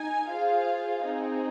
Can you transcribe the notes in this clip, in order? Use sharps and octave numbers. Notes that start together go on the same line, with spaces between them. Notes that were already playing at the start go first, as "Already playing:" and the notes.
Already playing: D#4 G#5
F4 G#4 C5 F5
C4 D#4 G#4